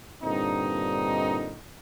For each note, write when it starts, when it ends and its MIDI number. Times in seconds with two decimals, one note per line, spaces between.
0.23 1.57 43
0.23 1.57 46
0.23 1.57 50
0.23 1.57 60
0.23 1.57 63